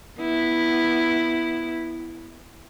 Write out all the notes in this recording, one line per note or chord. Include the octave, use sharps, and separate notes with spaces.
B3 E4